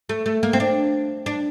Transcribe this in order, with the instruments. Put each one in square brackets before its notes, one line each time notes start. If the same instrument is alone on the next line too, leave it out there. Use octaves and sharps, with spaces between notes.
[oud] A3
A3
A#3
C4
D4
D4